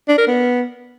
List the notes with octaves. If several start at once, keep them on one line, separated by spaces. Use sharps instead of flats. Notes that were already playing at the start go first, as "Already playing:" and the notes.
D4
A#4
B3